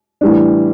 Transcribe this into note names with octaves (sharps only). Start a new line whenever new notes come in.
A2 E3 G3 D4